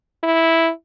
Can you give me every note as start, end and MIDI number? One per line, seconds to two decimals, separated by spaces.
0.23 0.71 64